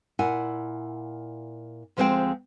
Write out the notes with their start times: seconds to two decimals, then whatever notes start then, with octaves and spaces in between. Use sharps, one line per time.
0.19 A#2 E4 F#5 G#5
1.97 D2 F3 G#3 C4 C5 G5